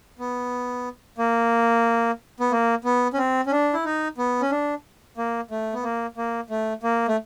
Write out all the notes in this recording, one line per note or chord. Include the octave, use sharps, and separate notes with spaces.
B3
A#3
B3
A#3
B3
C#4
C4
C#4
D4
E4
D#4
B3
C#4
D4
A#3
A3
B3
A#3
A#3
A3
A#3
A3